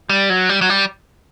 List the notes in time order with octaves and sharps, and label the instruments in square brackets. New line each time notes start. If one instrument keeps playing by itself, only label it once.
[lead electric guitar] G3
F#3
G3
F#3
G3